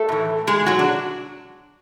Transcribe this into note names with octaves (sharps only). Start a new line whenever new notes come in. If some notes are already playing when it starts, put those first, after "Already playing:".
Already playing: A3 A4
A2 E3
B2 G#3 G#4
F#3 F#4
D4